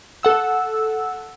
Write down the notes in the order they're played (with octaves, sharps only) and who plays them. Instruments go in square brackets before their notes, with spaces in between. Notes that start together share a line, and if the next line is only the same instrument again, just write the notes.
[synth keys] A4 F#5 E6